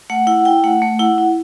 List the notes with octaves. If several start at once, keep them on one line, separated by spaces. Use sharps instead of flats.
A3 F#5
E4 F#5
E4 G5
A3 F#5
A3
E4 F#5
E4